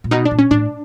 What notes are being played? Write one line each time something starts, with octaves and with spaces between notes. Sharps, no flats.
A#2
B2 D#4
D4
A#2
C#4
A2 D4